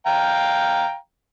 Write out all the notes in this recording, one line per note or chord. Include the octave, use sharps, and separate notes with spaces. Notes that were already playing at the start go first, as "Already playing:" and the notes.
F5 G5 A#5